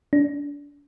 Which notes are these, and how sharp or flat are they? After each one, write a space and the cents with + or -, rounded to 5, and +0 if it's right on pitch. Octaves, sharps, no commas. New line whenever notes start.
D4 -30